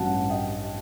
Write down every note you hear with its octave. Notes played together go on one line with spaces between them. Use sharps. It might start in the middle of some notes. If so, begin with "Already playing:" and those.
Already playing: A1 G2 F#3 F#5 A5
D#5 G5